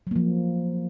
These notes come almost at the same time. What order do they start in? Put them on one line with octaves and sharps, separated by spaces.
F#3 A#3 F3